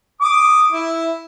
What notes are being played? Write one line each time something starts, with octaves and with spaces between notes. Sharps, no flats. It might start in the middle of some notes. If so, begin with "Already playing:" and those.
D6 D#6
E4